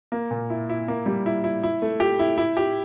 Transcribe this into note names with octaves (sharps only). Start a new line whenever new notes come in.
A#3
A#2
E4
E4
A#3
G3
E4
E4
E4
A3
G4
E4
E4
G4